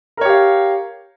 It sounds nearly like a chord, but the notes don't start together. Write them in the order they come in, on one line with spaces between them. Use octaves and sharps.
A#4 C#5 G4 F5